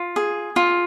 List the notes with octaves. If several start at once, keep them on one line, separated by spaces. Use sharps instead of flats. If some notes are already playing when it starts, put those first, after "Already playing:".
Already playing: F4
G#4
F4